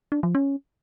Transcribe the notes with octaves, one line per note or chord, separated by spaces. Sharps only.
D4
F3
C#4